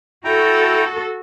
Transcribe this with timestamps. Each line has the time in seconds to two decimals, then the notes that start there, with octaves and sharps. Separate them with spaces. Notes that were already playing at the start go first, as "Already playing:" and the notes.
0.24 E4 F#4 A4 G5 A#5